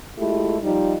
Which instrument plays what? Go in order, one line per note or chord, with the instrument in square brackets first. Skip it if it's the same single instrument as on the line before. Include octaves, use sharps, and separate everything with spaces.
[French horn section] G#3 A3 E4 F4 G4
F3 G3 D#4